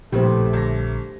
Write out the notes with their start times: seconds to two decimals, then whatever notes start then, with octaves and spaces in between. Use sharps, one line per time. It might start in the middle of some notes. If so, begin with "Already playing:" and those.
0.13 A#1 A2 C#3 A3 B3 G4 A4 C5
0.53 G1 A#6